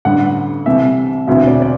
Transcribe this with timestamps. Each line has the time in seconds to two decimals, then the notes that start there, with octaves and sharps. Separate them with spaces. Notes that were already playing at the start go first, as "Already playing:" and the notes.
0.05 A1 G2 D3 F#5
0.66 C2 C3 E3 E5
1.27 E1 D2 C3 E3 E5
1.47 D5
1.62 D5